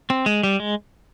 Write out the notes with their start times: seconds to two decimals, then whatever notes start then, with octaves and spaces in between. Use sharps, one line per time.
0.10 C4
0.26 G#3
0.43 G3
0.60 G#3